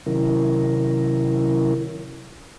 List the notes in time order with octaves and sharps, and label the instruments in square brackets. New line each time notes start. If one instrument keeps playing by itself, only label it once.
[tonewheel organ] C3 D#3 F#3 C#4 E4 A#4